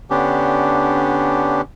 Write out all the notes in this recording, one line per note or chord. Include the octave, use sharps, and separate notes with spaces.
D3 B3 C#4 D4 G4